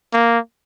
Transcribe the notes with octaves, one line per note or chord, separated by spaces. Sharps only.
A#3